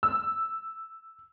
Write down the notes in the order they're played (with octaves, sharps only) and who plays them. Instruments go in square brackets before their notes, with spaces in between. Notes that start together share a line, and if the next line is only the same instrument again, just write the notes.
[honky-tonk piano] E6